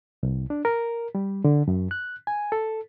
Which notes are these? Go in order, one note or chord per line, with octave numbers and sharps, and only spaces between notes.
C2
D4
A#4
G3
D3
F#2
F#6
G#5
A4